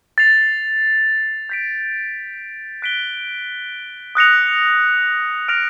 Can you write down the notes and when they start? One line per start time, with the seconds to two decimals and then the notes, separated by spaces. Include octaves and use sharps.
0.18 A6 C7 F7
1.49 G6 B6 D7
2.82 F#6 B6 D7 G7
4.15 D#6 F#6 A#6 C#7 F7
5.48 F6 A#6 D7 F7